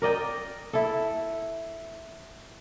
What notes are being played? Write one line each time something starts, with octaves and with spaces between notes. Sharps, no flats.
A#4 D5 D#5 G5
E4 A4